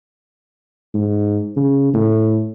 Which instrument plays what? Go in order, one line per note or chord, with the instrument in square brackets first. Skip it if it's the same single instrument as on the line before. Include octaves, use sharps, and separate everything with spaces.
[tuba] G#2
C#3
A2